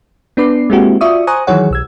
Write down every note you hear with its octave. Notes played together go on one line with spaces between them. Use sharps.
B3 D4 B4 D6 C7
G#3 A#3 C4 E4 F#4 G4
F4 F#4 D5 E5 C#6 D#6
C5 G#5 A#5 C#6 D#6 F#6
D#3 E3 F#3 G#4 C#5 F#5
B1 E6 G#6